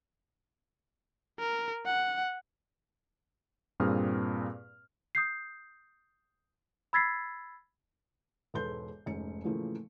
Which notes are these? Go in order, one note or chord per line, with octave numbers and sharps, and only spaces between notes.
A#4
F#5
G2 A#2 C4 G#4 D#6 F6
D#6 G6 C7
B5 E6 G#6 A6 B6 C7
E1 G#2 A4 B4 C6 G6
F1 G#2 C#4 C#7
A2 C#3 E3 F3 A3 A#3